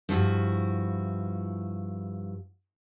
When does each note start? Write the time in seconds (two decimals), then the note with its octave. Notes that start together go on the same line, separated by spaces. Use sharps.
0.09 G2 F3 E4 F#4